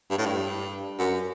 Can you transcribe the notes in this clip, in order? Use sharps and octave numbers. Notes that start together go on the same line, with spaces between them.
G2
A2
G2
F#2